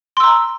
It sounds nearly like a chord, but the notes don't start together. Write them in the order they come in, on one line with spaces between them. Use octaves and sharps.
C6 E6 A#5